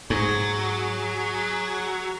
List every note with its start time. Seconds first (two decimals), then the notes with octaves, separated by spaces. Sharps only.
0.10 G#2 F#3 G#4